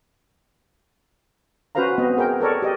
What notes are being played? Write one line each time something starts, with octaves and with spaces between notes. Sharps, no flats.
C#4 F#4 B4 C5 F5 A#5
B3 C4 D#5
G#4 A#4 G5
A4 A#4 C#5 D5
G4 D5 D#5